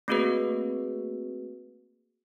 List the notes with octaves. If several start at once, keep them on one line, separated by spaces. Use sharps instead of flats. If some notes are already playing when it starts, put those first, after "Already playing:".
A3 A#3 C4 F#4 G#4 B4